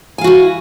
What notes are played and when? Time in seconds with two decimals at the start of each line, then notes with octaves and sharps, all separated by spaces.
0.18 G#5
0.21 F5
0.24 F#4
0.27 E4